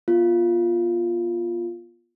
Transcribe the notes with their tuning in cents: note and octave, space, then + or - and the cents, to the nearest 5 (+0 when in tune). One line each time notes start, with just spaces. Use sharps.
B3 -40 F4 +0